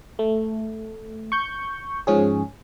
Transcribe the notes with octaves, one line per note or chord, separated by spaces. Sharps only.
A3
C#6 G6
G#2 F3 C#4 G#4